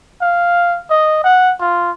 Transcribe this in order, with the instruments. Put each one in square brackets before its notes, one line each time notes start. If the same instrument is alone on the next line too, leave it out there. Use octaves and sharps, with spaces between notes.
[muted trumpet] F5
D#5
F#5
F4